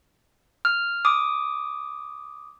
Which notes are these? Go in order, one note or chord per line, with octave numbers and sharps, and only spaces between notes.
F6
D6 D#6